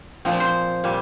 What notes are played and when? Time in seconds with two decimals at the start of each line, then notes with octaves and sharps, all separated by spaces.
0.25 A#2 F3 C4
0.40 C5
0.84 A#2 G3